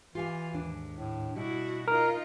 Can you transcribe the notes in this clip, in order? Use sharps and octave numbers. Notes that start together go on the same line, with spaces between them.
E3 F4 G4 F5 G#5
D#2 G#2 D4
A2
B2 G3 E4 F#4
D#4 F4 A#4